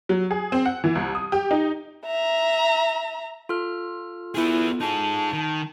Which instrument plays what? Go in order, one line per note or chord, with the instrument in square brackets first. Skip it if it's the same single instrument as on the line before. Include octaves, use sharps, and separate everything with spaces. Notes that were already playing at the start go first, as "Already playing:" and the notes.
[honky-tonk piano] F#3
G#4
C4
F#5
E3
C2
D#6
G4
D#4
[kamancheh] E5 A#5
[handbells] F4 A4 F6
[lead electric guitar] B3 G#4 [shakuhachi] E4
[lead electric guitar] D#4 G#4 [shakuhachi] A5
[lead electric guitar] D#3